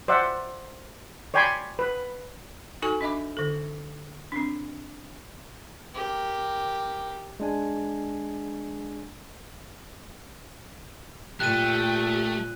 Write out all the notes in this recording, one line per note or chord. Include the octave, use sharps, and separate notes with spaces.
C5 D5 E5 F#5
C#5 D5 G5 G#5 B5 C6
B4
D#4 F#4 A4 G#5 C#6
D4 D#5 E5 B5 D6
D3 A4
C4 D4
G4 A#4
G#3 D4 G#5
A#2 A3 G4 F#6 D#7